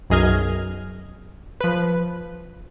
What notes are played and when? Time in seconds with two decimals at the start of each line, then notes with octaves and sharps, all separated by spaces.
0.10 B1 F#2 G#4 D#5 F6 G#6
1.61 F3 B4